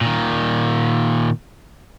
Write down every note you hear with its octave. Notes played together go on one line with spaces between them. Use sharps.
A#2 D#3